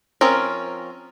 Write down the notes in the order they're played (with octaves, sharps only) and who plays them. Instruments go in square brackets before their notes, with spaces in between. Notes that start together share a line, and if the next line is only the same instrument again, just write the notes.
[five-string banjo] F3 C4 C#4 A#4